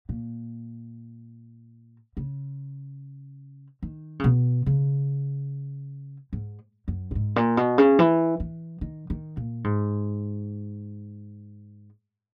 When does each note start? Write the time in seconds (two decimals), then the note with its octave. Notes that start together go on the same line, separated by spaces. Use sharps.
0.09 A#2
2.17 C#3
3.83 D#3
4.19 C#3
4.24 B2
4.66 C#3
6.33 G#2
6.88 F#2
7.11 A#2
7.15 G#2
7.36 A#2
7.57 B2
7.78 C#3
7.99 E3
8.40 E3
8.81 D#3
9.10 D#3
9.37 A#2
9.64 G#2